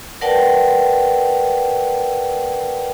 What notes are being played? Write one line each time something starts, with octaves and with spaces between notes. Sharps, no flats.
A#4 B4 D5 F#5 G5 A5